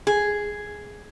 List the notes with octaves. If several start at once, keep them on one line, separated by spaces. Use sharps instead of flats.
G#4